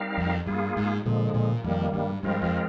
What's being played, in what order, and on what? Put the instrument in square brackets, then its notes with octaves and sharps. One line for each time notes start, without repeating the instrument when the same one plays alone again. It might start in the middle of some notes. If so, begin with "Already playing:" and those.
Already playing: [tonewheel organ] G3 C4 D#4 A#4 F5
[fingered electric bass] F2
[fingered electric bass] G2 [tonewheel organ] A#3 F4 G#4
[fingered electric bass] G#2
[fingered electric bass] A#2 [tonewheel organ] D3 F3 G#3
[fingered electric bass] A#2
[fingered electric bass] F2 [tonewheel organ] D#3 G3 A#3
[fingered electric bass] G2
[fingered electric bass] G2 [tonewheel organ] F3 G#3 C4 F4 A#4
[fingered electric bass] F2